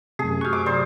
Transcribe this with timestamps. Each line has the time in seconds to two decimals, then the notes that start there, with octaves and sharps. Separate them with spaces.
0.19 F#2 C3 A3 G#4
0.41 F#4 G4 C#6 F6
0.53 C3 D6
0.66 G2 F#3 C5 D5